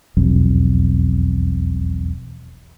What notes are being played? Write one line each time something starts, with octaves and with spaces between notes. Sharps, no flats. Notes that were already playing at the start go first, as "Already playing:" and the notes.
E1 B1 F2